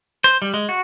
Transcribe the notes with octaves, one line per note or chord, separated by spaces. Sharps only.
C5
G3
G#3
F#4